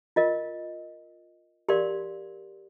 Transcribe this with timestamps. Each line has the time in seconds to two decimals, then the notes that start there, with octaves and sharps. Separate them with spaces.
0.16 F4 A#4 D#5
1.68 G4 A#4 D5 F5 C6